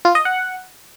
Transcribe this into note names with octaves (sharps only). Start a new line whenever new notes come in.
F4
D#5
F#5